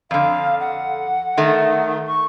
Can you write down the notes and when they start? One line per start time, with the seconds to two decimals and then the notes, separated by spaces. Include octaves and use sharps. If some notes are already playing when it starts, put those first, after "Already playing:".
0.11 F2 D3 F5
0.60 F#5
1.37 D#3 A3
2.07 C#6